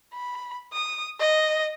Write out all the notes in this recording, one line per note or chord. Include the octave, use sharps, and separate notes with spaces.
B5
D#6
D#5